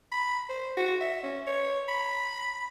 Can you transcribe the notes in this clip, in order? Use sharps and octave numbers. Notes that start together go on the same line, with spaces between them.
B5
C5
F#4
E5
C#4
C#5
B5